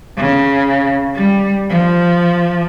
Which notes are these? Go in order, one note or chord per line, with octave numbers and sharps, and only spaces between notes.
C#3
G3
F3